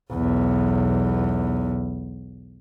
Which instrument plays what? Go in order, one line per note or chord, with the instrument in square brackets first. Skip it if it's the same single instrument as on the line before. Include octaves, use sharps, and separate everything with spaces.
[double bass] B1 E2